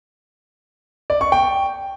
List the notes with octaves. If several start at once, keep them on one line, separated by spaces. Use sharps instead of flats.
D5
C#6
G5